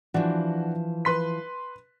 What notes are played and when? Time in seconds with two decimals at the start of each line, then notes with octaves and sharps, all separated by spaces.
0.14 E3 F3 D4 F#4
1.05 B4 C6 B6